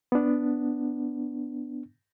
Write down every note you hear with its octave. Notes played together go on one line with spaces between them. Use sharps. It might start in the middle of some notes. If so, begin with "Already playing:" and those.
B3 D4